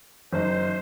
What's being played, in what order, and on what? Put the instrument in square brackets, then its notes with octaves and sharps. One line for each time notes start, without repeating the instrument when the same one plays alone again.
[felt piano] F#1 D#4 [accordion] C5